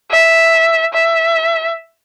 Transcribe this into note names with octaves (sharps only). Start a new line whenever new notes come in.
E5
E5